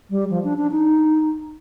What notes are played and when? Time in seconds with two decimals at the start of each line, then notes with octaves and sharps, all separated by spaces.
0.10 G3
0.30 F3
0.44 D4
0.58 D4
0.71 D#4